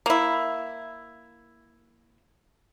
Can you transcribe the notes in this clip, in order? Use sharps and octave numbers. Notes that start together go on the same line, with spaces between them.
A#3 E4